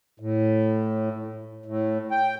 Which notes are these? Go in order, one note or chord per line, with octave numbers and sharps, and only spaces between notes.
A2
A2
G5